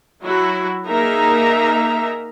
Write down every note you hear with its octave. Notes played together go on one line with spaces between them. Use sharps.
F#3 E4 F#4
A#3 D#4 G#4 A#4 E5 A#5